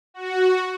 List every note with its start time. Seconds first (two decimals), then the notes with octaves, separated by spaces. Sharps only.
0.14 F#4